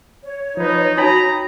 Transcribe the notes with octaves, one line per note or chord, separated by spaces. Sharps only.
C#5
F3 D#4 B4
D#4 F#4 G5 A#5 B5 D#6